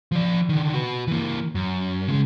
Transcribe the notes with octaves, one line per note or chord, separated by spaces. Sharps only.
F3 D5
D3 D#3
F#4 B4
E3 A#3
F#2
C#3 G#3